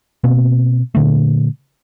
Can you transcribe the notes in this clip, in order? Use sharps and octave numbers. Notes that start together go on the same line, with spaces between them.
B2 A#3 C4
A#2 D3 A3